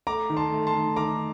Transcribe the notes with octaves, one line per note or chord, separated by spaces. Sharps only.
A3 A#5 D6
D#3
A5 C6
A3
A5 C6
D#3
D#3 A#5 D6